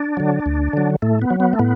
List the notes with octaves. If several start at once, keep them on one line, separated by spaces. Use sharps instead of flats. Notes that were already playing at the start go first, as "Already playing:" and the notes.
Already playing: D4
D3 F#3
D2
D3 F#3
A2 A3
B3
F#3
B3
A3
A2 B3